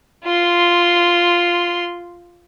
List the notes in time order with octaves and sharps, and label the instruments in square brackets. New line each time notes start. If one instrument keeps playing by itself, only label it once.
[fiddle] F4 C6